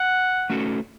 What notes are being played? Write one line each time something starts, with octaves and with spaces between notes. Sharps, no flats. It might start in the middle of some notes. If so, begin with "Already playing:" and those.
Already playing: F#5
A3 C#4 F#4 A4